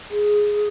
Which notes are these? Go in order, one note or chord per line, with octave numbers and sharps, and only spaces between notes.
G#4